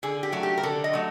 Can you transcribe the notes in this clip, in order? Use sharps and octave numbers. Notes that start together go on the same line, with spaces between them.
D3 G#4
G4
F#3 A3
G4
A#4
D3 A4
D#5
F#3 A3